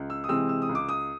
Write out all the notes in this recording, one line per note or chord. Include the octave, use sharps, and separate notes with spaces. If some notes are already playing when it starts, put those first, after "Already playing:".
Already playing: C#2
E6
D#6
C3 E3 G#3 C4 E6
E6
D#6
C#2
D6
D#6